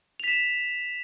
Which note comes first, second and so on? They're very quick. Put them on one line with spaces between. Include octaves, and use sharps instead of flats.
F7 B6 E7